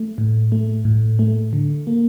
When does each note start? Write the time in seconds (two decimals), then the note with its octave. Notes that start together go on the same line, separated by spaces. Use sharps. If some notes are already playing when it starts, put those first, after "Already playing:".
Already playing: A3
0.18 A2
0.52 A3
0.85 A2
1.19 A3
1.53 D3
1.87 A#3